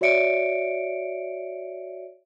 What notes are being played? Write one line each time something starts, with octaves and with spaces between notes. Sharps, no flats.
F#4 C#5 D5 E5 C#7 D7